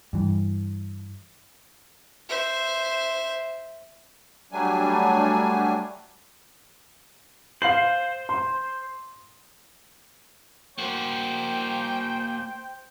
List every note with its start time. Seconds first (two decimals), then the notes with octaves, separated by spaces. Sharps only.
0.13 G2 E3
2.29 C5 E5
4.52 F#3 G3 A3 D4 G#5
7.62 C5 F5 C7 F#7
8.29 C6
10.78 A#3 F#4 C5 G5